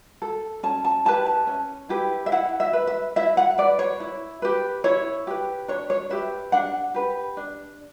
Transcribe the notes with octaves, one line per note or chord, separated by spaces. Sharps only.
A4
C#4 A5
A5
E4 G4 B4 A5
A5
C#4
E4 G4 B4
E5
E4 F#5
E5
B4
E5
E4 E5
F#5
B4 D5
C#5
E4
G4 B4
E4 C#5
G4 B4
D4 C#5
C#5
G4 B4 E5
D4 F#5
G4 B4
D4